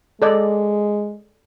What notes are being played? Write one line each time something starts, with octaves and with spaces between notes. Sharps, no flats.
G#3 A4 D5 D#5